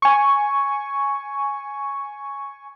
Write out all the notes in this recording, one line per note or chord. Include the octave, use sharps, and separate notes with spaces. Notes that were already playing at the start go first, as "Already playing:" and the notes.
G#5 C#6